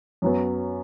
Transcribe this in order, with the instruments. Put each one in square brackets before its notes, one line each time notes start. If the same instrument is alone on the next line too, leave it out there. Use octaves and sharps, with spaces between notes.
[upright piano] F#2 F#3 B3